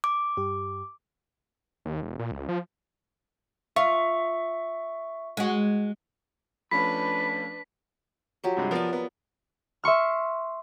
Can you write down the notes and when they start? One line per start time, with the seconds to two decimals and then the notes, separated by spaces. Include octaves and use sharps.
0.04 D6
0.37 G2 G4
1.85 D#2
2.03 E1
2.19 A#2
2.31 C#2
2.49 F3
3.76 F4 E5 C#6
5.37 G#3 F#4
6.71 F3 A3 C#4 D4 B4 B5 B6
8.44 F3 F#3 G4
8.57 G2 C3 G#3
8.71 F3 B3 A#4 D5
8.93 B3
9.84 E5 C6 C#6 F6